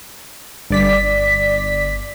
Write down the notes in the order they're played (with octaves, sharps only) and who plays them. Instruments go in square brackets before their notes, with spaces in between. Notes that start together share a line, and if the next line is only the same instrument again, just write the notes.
[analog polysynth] G1 D5 B6